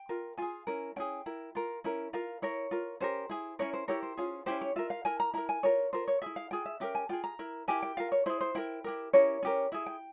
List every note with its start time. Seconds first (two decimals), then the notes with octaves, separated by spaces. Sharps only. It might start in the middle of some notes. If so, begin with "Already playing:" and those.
Already playing: G5
0.09 F4 A#4
0.37 F4 G#4 G#5
0.67 C#4 E4 A#4
0.96 C#4 E4 G#4 G5
1.26 E4 A#4
1.55 F4 A#4
1.84 C#4 E4 A#4
2.13 F4 A#4 F5
2.42 E4 A#4 C#5
2.71 F4 A#4
3.00 C#4 G4 A#4 C5
3.29 E4 G#4
3.59 C#4 E4 A#4 C#5
3.73 C5
3.88 E4 G4 A#4 C#5
4.03 C5
4.17 C#4 F4 G#4
4.46 C#4 E4 G4 C5
4.61 C#5
4.76 F4 A#4 E5
4.90 F5
5.05 E4 A#4 G#5
5.20 A#5
5.34 E4 A#4 A#5
5.49 G#5
5.63 F4 A#4 C#5
5.93 F4 A#4 C5
6.08 C#5
6.22 E4 G#4 E5
6.36 F5
6.51 F4 G#4 G5
6.65 E5
6.80 C#4 G4 A#4 E5
6.95 G#5
7.09 F4 G#4 G5
7.24 A#5
7.39 E4 A#4
7.68 E4 G4 A#4 G#5
7.83 G5
7.97 F4 A#4 F5
8.12 C#5
8.26 E4 G#4 C5
8.41 C5
8.55 E4 A#4 G5
8.84 E4 G4 A#4
9.13 C#4 E4 G4 A#4 C#5
9.43 C#4 G4 A#4
9.72 E4 G#4 E5
9.86 G5